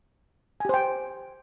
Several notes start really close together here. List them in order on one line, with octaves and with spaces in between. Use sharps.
G#5 G4 C5 G5